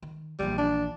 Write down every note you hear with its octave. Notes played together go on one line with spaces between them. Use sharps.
D#3
A#1 E3 G3
D4